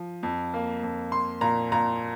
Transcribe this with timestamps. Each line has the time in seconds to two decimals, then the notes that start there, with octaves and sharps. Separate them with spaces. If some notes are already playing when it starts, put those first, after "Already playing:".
Already playing: F3
0.23 F2
0.54 A#3
0.83 F2
1.12 A#3 C6
1.41 A#2 A#5
1.72 A#2 A#5